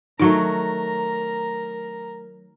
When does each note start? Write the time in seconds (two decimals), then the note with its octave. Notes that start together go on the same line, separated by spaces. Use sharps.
0.20 D#3 F#3 A3 D#4 A#4 A#5